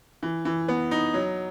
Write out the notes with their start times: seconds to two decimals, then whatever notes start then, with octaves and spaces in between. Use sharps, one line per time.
0.23 E3
0.45 E3
0.68 B3
0.91 D#4
1.14 F#3